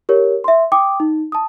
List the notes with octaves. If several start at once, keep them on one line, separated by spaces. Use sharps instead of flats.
G4 A#4 C#5
E5 C6
G5 D6 D#6
D#4
A5 D#6